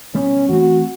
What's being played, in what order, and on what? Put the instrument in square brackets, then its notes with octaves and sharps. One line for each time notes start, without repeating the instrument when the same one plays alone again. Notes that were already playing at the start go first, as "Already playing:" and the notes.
[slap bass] B2 G3 B3 [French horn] C#4
[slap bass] E3 A3 C4 [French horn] F#4